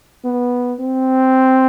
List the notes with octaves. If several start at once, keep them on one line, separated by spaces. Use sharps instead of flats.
B3
C4